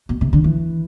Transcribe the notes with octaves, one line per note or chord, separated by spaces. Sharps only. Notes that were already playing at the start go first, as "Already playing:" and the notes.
B2
C3
D3
E3